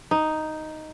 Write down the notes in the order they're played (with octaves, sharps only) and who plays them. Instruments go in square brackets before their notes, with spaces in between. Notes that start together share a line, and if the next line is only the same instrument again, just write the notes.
[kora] D#4